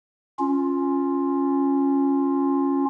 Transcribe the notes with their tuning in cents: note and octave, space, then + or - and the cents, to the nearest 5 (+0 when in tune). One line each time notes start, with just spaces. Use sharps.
C#4 +0 F4 +5